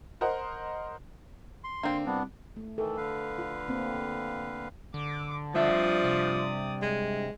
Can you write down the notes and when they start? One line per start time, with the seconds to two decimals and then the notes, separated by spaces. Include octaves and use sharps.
0.21 A#4 C5 D#5 F#5 C6
1.64 C6
1.83 D3 A#3 C4
2.06 C2 B3 D4
2.57 A3
2.78 D#3 E3 A4
2.97 D3 B4 F5
3.38 F4
3.68 A#3 C4
4.94 D3 D6
5.55 G2 F3 D5 E5 D#6
6.04 C3
6.82 G#3